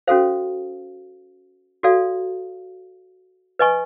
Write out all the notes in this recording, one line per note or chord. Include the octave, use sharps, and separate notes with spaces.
C#4 F#4 A4 C5 F5
F#4 A4 D5 F5
B4 D#5 G#5 C#6